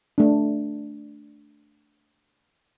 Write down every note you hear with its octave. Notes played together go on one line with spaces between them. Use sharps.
A3 D4